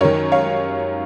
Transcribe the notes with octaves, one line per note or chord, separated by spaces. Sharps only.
F#2 D#3 A#4 C#5
C#5 F5